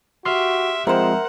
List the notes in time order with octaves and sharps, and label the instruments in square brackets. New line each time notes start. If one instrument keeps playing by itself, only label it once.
[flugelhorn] F#4 [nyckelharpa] G4 E5 [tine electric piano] C6 F6
[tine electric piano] F3 G#3 C4 [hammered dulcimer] A#4 C5 [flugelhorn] E5 [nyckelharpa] F#5